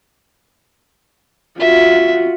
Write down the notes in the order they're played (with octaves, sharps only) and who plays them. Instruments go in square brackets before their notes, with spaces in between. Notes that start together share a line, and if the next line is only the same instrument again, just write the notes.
[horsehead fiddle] F4 F#4 [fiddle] E5